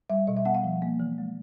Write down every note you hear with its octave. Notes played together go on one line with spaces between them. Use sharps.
G3 E5
B2 D#5
E5
B3 F#5
F5
F3
A#3
E3
G#3